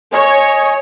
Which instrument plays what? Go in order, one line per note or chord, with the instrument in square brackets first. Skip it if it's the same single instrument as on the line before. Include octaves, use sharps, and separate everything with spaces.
[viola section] C#5 [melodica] D#5 G#5